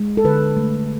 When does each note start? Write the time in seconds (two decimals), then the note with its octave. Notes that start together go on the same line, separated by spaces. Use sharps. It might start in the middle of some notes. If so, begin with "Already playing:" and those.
Already playing: G#3
0.17 A4
0.24 D3 B4
0.57 A3